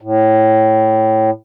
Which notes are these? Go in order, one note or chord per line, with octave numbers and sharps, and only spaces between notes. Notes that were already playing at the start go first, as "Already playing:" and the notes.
A2